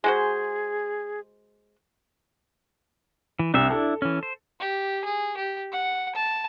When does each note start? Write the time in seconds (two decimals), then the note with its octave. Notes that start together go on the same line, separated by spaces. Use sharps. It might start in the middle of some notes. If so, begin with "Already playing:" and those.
0.04 G#3 F#4 G#4 C5
3.39 E3
3.54 C2 D4 E5
3.70 D4 E4 A4
4.02 E3 C#4
4.23 C5
4.60 G4
5.05 G#4
5.37 G4
5.72 F#5
6.15 A5